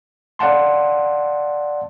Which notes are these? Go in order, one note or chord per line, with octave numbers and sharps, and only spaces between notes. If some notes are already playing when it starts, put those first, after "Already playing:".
D5 F5 F#5 A5 C6